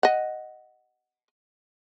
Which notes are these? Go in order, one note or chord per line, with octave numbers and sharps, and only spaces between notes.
D#5 F#5